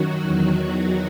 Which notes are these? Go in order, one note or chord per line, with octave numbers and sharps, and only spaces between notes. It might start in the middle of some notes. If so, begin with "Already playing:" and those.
Already playing: F#2 D#3 F#3 F#4
E2 D#3 F#3